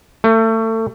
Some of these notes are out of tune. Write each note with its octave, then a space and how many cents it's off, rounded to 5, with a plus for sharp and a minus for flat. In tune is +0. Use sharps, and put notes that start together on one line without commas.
A3 +30